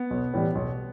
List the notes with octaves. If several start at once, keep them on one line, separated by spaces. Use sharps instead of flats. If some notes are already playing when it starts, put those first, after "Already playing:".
Already playing: B3
B1
A2 E3 G3
B1